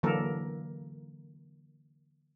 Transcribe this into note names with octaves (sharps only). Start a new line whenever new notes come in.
D3 E3 F#3 A#3 A4 A#4